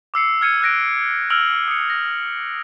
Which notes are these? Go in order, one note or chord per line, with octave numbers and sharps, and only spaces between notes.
D6 E6 C7 C#7
F6 G#6 C#7 D#7
E6 F#6 A#6 D7
E6 F6 D7 F7 F#7
D#6 C#7
A#6